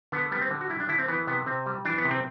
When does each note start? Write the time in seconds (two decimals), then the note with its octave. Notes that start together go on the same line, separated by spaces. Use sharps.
0.12 D3 B3
0.31 G3 B3
0.41 C4
0.51 D3
0.61 F#4
0.70 G3 E4
0.80 D4
0.89 D3 E4
0.99 C4
1.08 E3 B3
1.27 C3 B3
1.46 C3 C4
1.66 G3
1.85 E3 D4
1.98 B3
2.05 C3
2.11 C4